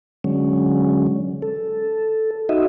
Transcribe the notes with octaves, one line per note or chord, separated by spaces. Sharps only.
D3 F#3 G#3 C#4
A4
D#4 F#4 D#5 E5